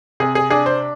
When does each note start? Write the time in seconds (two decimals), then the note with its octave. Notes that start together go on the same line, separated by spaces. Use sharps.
0.20 C3 G#4
0.35 G#4
0.50 D4 G#4
0.66 C5